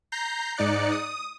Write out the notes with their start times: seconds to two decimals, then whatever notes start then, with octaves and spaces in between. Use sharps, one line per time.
0.12 A#5 G6 A#6 C7
0.57 G#2 D#4 D5 F#6 C#7
0.92 D#6